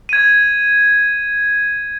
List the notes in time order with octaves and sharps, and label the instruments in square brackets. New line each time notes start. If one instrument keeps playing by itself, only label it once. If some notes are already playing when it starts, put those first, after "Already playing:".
[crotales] G#6 D#7